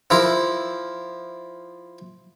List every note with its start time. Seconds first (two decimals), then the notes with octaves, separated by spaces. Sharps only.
0.10 F3 E4 A#4